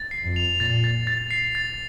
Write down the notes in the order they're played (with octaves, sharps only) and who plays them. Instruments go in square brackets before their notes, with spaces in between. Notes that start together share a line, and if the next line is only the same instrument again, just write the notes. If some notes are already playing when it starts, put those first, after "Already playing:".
Already playing: [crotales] A6
C7
[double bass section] F2
[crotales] F7
[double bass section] A#2 [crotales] A6
[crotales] A6
A6
C7
A6